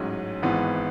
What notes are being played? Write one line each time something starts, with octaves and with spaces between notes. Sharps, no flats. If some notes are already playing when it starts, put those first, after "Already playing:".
Already playing: A1 G#2 F#3 C#4
G#1 G#2 E3 B3